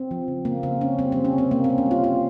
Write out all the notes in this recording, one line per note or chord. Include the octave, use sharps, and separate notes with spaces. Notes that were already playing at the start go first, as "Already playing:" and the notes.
Already playing: C4
F3
C#3
C#3 A#3
C#3 C4
C#3 C#4
G3 C4
G3 C4
C#4
C3
C4
C3 A#3
C4
A#3
C#4
G3 F4
A#3 F4